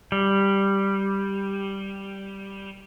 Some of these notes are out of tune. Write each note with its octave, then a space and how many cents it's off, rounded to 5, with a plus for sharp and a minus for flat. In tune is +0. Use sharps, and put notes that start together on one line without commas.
G3 +0